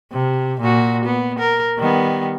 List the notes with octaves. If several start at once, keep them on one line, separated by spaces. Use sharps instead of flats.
C3
A#2 F#4
B3
A#4
D#3 G3 B3